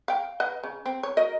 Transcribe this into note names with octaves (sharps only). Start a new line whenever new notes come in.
F5 G5
B4 D#5 F#5
C#3
C4
C#5
F#4 A#4 D#5